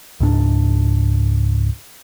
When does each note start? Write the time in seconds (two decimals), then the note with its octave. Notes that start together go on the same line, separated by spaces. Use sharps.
0.20 C#2 G#2 C#4 D4